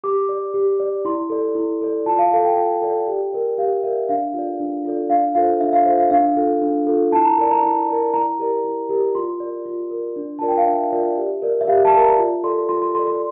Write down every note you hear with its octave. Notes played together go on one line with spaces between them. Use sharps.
G4 D6
D5
G4
D5
E4 C6
A4 D5
E4
A4 D5
F4 A5
F5
A4 D5 F5
G5
F4
A4 D5
G4
A#4 D5
G4 F5
A#4 D5 E5
D4 F5
F4 A4 D5
D4
F4 A4 D5
D4 F5
F4 A4 C5 F5
D4 E5
F5
F4 A4 C5 F5
F5
D4 F5
F4 A4
D4
F4 A4
E4 A5
A#5
A#4 D5 A5
A#5
E4 A5
A#4 D5
E4 A#5
G4 A#4 D5
E4
G4 A#4 D5
F4 C6
A#4 D5
F4
A#4 D5
D4
F4 A#4 D5 A5
G5
F5
D4 E5
F4 A#4 D5
G4
A#4 D5
E5
G4 F5
A5
A#4 D5
A#5
F4
A4 D5 C6
F4 C6
C6
A4 D5 C6
C6